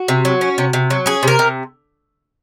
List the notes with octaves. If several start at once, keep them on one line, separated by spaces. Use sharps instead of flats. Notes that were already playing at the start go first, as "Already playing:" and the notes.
Already playing: F#4
C3
F#3
C#4
C3
C3
F#3
C#4 G#4
C3 A#4
C3